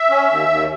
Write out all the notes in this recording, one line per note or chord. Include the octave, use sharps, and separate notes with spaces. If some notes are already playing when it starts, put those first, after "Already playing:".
Already playing: E5
C#4
D#2
D#2